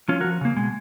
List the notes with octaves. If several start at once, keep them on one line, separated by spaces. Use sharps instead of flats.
F3 C#4 F4
F#4 A#4
F3
C#3 A#3
B2 G#3